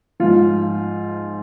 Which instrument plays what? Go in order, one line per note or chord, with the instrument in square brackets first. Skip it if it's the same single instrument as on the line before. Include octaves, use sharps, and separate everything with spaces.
[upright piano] G#2 F3 F4